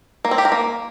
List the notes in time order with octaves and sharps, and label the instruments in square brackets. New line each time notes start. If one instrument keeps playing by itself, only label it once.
[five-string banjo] A#3
C4
G4
A#4
A#3